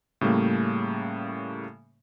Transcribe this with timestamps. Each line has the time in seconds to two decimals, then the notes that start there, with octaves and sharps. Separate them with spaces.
0.21 A2 C#3 G3 A3 A#3